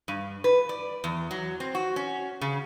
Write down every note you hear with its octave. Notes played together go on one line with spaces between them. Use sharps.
G2
B4
D5
E2
F#3
C4
F#4
C#4
C#3